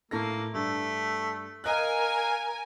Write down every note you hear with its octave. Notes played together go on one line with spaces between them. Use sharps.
A2 A#3 A4 A#6
G2 A3 D4
A#4 D#5 F5 G#5 F#6